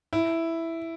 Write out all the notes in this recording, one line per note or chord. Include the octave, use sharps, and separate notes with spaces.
E4